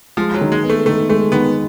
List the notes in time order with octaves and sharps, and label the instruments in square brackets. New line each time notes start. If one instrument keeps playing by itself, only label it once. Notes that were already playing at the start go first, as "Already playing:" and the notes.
[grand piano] F3 [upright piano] G#3
[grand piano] F#3
[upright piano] D#3
[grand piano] G#3
[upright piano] B3
[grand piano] A3
[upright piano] D#3 [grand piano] A3
[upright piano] G#3 [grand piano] A3
[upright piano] D#3 [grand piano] B3